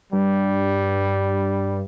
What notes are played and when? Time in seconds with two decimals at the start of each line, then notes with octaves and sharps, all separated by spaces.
0.13 G2 G3